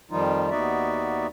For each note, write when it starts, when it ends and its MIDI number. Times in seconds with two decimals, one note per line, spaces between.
0.11 0.50 41
0.11 0.50 51
0.11 0.50 53
0.11 0.50 55
0.11 0.50 63
0.11 0.50 65
0.50 1.27 39
0.50 1.27 59
0.50 1.27 63
0.50 1.27 66
0.50 1.27 74
0.50 1.27 76